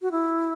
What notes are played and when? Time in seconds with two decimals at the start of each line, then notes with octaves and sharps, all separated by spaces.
0.02 F#4
0.11 E4